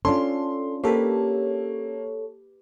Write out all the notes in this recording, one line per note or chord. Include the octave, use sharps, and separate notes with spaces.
C#4 D4 F4 A4 C6
A#3 G4 A4 B4 C#5